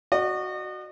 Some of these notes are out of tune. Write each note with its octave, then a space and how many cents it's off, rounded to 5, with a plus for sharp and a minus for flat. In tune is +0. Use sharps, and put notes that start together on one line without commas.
F#4 +0 D#5 -40